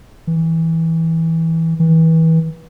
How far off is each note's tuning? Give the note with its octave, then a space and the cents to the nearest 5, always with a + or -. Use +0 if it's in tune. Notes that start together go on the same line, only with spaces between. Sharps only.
E3 -15
E3 -30